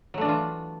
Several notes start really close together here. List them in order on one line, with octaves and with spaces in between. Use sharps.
F#3 A3 D4 E3 F4